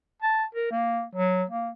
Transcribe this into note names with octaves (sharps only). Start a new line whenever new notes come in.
A5
A#4
A#3
F#3
A#3